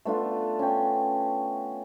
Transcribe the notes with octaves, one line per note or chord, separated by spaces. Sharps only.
A3 B3 D4 F4
C#4 G5